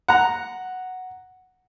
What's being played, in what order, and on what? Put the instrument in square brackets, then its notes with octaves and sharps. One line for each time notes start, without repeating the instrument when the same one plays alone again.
[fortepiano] F#5 A#5